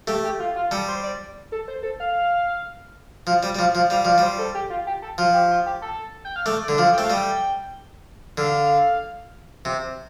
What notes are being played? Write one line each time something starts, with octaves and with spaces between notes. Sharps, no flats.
A3 G4
G4
F4
F4
G3 A4
C5
D5
A4
C5
A4
F5
F3
G3
G3
F3
F3
G3 F5
F3 D5
G3 C5
A4
G4
F4
G4
A4
F3 F4
G4
F4
G4
A4
G5
F5
A3 D5
D5
D3
F3 D5
A3 G5
F5
G3 G5
D3 F5
C3